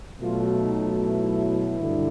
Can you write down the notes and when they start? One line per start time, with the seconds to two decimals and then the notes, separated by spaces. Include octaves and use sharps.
0.21 B2 F#3 A3 F4
0.60 D#4
1.00 E4
1.80 G2 D3